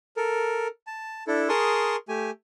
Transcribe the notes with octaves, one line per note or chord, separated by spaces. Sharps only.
A4 A#4
A5
D4 E4 A4
G#4 A#4 A5 C6 C#6 D#6
A3 G4 G#5